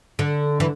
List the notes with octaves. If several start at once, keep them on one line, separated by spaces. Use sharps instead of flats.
D3
E3